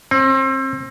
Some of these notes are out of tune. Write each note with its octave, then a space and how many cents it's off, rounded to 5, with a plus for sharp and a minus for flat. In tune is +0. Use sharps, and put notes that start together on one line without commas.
C4 +35